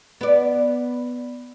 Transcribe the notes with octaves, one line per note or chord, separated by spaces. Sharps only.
B3 D5